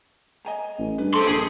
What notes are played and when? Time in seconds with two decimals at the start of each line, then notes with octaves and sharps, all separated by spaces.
0.45 D#5 G#5 A#5
0.78 A1
0.98 G2 B4
1.14 C3 A4 C5 C6
1.27 A#1 G#4